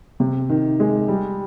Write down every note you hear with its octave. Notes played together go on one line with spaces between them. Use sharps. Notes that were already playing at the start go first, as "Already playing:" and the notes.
C3
D#3
G#3
G3